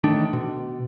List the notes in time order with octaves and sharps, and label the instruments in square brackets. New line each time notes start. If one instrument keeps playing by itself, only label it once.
[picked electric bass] A1 D#3 A3 D4
B2